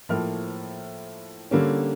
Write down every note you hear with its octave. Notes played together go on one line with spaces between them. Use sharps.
A2 F3 A#3 F6
D3 G3 A#3 C#4